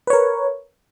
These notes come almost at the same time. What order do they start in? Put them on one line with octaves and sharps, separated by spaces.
B4 C#5 A#4